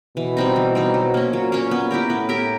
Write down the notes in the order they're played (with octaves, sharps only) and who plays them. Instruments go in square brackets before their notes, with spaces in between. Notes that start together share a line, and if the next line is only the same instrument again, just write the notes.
[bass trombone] B2 [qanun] E3
[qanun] G3 C4 D#4
E3
G3 C4 D#4
F#3
A#3 C#4
[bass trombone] A#2 [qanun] F#3
[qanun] A#3 C#4
B3
E4 G4 A#4
[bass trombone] A2 [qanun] B3
[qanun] E4 G4 A#4